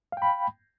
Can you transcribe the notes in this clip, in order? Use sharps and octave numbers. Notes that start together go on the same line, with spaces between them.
F5 G5 B5